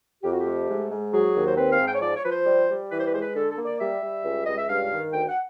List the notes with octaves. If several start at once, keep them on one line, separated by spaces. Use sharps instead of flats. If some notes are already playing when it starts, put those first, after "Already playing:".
F2 G4
F#4
G4
A3
G#2
G#2
F#3 G#4
D#2
C5
C4 B4
F5
G#2
G5
C#5
F3 D5
C#5
F3 B4
C5
G3
G3
E3 B4
C5
B4
G#3 C5
B4
D3 A4
A4
A#3
D5
G3 E5
G3
C#2
C#2 D#5
E5
G2 F5
D#3
D2 G5
F#5